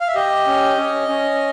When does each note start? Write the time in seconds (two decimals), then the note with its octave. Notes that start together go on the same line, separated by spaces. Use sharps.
0.01 F5
0.08 E5
0.15 G4 D#5
0.47 C#4
0.78 C#4
1.08 C#4